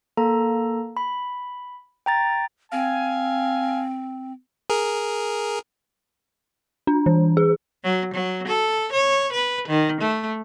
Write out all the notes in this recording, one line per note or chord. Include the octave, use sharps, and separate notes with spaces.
A#3 A4 A#5
B5
G5 A#5 A6
C4 F5 G#5
G#4 A#4
D4
E3
G#4
F#3
F#3
A4
C#5
B4
D#3
A3